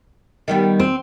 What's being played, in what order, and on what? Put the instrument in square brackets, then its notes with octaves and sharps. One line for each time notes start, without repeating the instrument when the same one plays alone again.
[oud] D#3 G3 B3
[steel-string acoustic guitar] C4